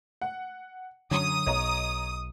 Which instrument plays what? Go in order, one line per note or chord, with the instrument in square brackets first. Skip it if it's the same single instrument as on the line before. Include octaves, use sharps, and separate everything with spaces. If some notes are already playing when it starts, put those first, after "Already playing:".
[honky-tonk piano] F#5
[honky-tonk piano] F#2 C#5 [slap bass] D3 F#3 [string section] D#6
[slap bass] B1 [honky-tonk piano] C#5 D#5 A#5